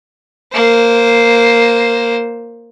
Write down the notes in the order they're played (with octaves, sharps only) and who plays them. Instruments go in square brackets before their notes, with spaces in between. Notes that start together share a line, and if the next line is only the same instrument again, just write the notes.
[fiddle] A#3 C5